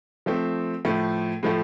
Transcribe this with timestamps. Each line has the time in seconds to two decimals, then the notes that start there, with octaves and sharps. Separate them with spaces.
0.26 F3 A3 C4
0.85 A2 F3 A3
1.43 A2 F3 A3